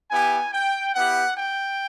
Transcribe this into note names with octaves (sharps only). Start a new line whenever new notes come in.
B3 E4 G4 G#5
G5
B3 E4 G4 F#5
G5